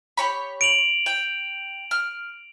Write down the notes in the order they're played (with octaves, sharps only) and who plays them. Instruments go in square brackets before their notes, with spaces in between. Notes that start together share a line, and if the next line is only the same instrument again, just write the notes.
[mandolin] G4 C#5 B5
[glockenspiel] D7 F7 F#7
[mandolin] G5
F6